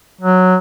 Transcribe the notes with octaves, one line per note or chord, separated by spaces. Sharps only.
F#3